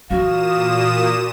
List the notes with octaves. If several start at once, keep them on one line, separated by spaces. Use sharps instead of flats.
A#2 E3 F#4 F5 D#6 E7